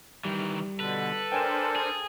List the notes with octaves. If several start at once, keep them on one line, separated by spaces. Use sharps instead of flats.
D#3 E3 G3
B2 D3 A4 B4
D4 A#4 C5 G5 G#5 E7
G#4